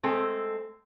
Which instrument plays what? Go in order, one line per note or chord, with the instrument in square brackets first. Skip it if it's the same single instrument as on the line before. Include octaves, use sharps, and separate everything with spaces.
[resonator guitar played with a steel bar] G#3 A3 C4 A4